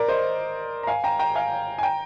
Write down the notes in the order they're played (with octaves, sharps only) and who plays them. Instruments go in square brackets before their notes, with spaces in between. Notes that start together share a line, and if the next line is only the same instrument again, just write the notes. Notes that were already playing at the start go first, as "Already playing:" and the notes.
Already playing: [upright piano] A#4 D5
C5 D#5
A#5
F5 G#5
G5 A#5
G5 A#5
F5 G#5
G#5
G5 A#5